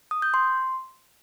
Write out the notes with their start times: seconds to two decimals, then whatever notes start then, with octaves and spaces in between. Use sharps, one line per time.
0.11 D#6
0.22 G6
0.34 C6